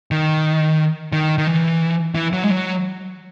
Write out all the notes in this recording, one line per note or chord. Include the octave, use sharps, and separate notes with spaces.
D#3
D#3
D#3
E3
E3
F#3
G#3
F#3